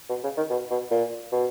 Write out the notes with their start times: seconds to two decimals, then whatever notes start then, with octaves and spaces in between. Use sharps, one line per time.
0.09 B2
0.24 C#3
0.37 D#3
0.50 B2
0.71 B2
0.91 A#2
1.32 B2